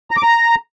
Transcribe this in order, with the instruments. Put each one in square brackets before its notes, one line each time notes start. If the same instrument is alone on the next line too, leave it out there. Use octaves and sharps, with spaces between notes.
[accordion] A#5
D6
A#5